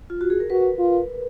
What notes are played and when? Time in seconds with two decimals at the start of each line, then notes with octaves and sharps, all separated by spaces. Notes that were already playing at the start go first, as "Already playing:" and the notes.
0.10 F4
0.21 F#4
0.30 G#4
0.40 A#4
0.50 F#4 B4
0.79 F4